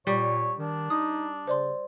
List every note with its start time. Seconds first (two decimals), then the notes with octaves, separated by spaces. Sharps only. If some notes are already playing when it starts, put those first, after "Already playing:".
0.07 A#2 G3 C#5
0.59 D#3 D4
0.90 D#4 D#6
1.47 C#3 C5 D5 C6